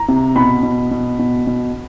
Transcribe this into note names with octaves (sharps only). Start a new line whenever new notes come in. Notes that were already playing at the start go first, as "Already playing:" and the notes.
Already playing: A#5
C3
B2 B5
B2
B2
B2
B2